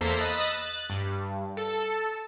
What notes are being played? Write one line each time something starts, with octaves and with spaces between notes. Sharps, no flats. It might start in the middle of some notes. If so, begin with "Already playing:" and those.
E2 A#3 A4 C5 A#5 B6
D#5 B5 D#6 E6 F#6 A6
F#6 A6
G2
A4